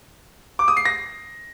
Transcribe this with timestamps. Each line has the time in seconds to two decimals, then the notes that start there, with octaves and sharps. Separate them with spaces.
0.59 D6
0.68 D#6
0.77 C7
0.85 A#6